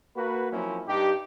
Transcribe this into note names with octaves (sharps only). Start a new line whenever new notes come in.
A#3 F#4 B4
F3 F#3 A#3 C4 C#4 E4
G2 G3 D#4 G4